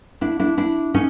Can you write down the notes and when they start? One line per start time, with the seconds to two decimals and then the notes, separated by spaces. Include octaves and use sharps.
0.21 D4 E4
0.39 D4 E4
0.58 D4 E4
0.94 C#4 D#4